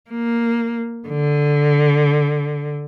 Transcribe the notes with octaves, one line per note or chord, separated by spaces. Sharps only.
A#3
D3